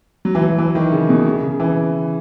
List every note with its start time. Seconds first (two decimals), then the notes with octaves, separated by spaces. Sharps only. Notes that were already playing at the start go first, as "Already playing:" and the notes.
0.25 F#3
0.35 E3
0.41 F#3
0.59 E3
0.75 D#3
0.92 C#3
1.09 B2
1.26 C#3
1.42 C#3
1.60 E3